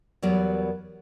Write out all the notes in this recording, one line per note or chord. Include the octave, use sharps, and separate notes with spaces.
E2 F#3 G3 B3 A#4 D5